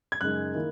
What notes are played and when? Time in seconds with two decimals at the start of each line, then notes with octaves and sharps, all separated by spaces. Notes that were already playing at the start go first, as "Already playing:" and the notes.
0.12 G#6
0.21 F#2 C#3 G#3 D#4 F#6
0.55 D#3 A#3 E4